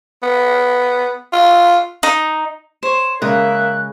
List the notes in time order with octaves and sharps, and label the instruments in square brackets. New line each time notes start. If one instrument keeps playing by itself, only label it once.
[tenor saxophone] B3
F4
[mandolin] D#4
[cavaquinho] C5 C#5 [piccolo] E7
[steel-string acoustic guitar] C#3 G#3 [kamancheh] A#3 E5 [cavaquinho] D#6 [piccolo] F#6